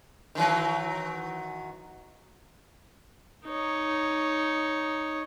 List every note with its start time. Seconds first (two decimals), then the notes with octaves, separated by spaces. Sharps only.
0.35 D#3 E3 F#3
3.47 D#4 C#5